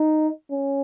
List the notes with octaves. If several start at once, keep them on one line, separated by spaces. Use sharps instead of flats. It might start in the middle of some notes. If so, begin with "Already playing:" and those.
Already playing: D#4
C#4